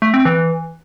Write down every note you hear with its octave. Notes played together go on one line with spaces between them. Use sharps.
A3
C4
E3